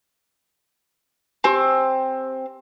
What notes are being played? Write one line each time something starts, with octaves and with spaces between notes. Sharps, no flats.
C4 G4 G#5